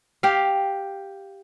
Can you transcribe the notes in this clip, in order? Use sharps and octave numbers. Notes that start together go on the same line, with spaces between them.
G4 F5